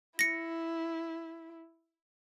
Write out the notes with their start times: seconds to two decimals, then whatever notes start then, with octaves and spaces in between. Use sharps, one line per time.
0.19 E4 A#6 C#7